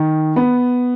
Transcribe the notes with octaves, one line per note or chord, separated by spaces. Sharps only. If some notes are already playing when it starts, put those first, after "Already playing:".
Already playing: D#3
B3